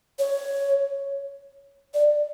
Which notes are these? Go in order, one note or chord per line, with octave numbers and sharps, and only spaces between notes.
C#5
D5